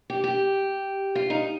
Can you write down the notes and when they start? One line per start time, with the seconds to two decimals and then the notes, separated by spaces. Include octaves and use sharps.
0.10 G4
0.24 G4
1.15 F4
1.30 D#4